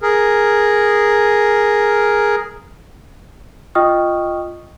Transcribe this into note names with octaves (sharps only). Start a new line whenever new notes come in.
G#4 A#4
F4 D#5 G5 C#6 D#6 F6